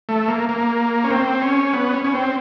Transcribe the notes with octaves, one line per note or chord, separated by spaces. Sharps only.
A3
A#3
A#3
C#4
C4
C#4
B3
C#4
C#4
C4